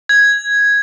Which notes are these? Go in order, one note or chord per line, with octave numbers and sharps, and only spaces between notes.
G#6